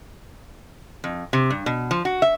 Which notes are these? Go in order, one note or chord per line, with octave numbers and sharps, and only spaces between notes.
F2
C3
G2
B2
F3
F#4
E5